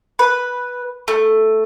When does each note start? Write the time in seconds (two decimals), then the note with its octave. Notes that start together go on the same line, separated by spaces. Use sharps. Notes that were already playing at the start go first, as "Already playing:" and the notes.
0.19 B4
1.08 A3